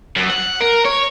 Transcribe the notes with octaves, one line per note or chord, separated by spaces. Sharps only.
F#2
F#5
A#4
C#5